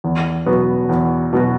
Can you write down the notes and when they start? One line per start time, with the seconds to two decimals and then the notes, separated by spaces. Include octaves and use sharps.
0.04 E2
0.46 B2 F#3 B3 F#4
0.89 E2
1.33 B2 F#3 B3 F#4